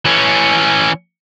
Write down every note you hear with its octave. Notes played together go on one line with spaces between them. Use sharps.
E3 C#4